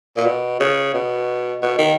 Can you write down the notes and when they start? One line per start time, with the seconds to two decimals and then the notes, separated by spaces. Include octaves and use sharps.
0.17 A#2
0.26 B2
0.60 C#3
0.94 B2
1.62 B2
1.78 D#3